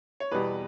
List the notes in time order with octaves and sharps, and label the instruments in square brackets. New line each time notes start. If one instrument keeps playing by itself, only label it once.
[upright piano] C#5
E2 B2 G3 B4